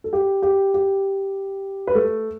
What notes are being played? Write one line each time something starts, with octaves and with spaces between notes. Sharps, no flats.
A4
G4
G4
G4
B4
A3 A4